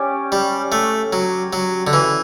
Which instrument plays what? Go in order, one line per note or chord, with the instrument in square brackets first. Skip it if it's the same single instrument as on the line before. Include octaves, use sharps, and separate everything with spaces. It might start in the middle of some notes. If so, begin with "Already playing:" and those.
Already playing: [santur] C#4 G4 D5
[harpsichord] G3
A3
F#3
F#3
D3
E3